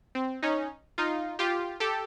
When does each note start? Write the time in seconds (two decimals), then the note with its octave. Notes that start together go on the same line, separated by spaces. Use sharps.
0.15 C4
0.43 C#4 D#4
0.98 D#4 F4
1.39 F4 G4
1.80 G4 A4